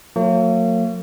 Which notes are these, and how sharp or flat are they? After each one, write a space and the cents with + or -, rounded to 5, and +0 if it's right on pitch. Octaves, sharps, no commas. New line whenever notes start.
F#3 -35 A#3 -45